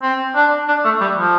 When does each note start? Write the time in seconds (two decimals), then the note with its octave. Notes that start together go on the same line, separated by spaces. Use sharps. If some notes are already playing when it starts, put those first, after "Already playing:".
0.02 C4
0.35 D4
0.68 D4
0.85 A3
1.01 G3
1.17 F3